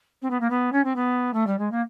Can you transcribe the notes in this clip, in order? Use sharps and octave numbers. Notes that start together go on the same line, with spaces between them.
C4
B3
A#3
B3
C#4
C4
B3
A3
G3
G#3
A#3